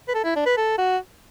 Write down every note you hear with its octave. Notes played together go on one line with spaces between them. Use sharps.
B4
A4
E4
D4
B4
A4
F#4